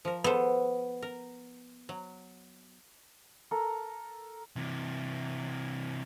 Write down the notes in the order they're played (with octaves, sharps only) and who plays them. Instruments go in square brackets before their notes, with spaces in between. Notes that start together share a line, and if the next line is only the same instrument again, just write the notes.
[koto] F3 A#4
[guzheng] B3 [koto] A4 C5
[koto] A#4
F#3
[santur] A4 A#4 A#5
[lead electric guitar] C3 E3